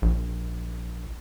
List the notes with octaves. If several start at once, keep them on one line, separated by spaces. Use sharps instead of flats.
A#1